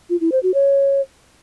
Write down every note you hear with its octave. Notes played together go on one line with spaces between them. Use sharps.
F4
E4
C5
F#4
C#5